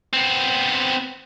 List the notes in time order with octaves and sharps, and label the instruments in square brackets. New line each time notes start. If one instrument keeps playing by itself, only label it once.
[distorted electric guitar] B3 C4